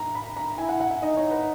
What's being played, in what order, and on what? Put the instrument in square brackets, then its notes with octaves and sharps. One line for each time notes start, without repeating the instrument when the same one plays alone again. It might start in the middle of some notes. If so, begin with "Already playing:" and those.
Already playing: [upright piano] A#5
B5
A#5
[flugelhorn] E4 [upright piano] G#5
[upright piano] F#5
F#5
E5
[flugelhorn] D#4 [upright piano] D#5
[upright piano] C#5
B4